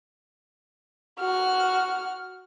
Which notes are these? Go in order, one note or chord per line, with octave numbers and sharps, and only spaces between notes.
F#4 F6